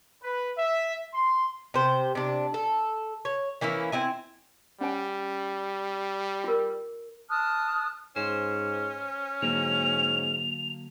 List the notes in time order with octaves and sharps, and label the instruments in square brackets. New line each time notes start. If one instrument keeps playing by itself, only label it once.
[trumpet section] B4
E5
C6
[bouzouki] C3 C5
C3 D4
A4
C#5
E3 A#3 C#4 E4
C4 E4 G#5
[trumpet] G3 [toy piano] C#4 C#5 G#5
[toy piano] F4 A#4
[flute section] A5 D#6 F6 F#6
[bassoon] G#2 [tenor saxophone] C#4 [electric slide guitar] C5
[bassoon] G#2 [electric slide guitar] D3 F#3 A#3 [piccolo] F7